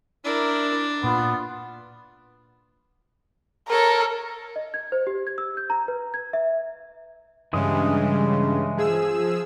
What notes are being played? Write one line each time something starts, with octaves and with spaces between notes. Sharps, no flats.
D4 E4 A#4
A#2 B3 F4
A4 A#4 C#5
D#5
G#6
C5
G4
G#6
E6
G6
A#5
B4
G#6
E5
G2 C#3 E3 G#3 D#6
F3 G#4 E6